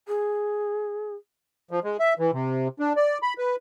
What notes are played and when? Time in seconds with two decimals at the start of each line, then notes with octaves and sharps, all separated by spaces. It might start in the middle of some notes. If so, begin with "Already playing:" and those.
0.08 G#4
1.71 F3
1.84 G#3
2.00 E5
2.19 E3
2.33 C3
2.79 D4
2.96 D5
3.23 B5
3.38 B4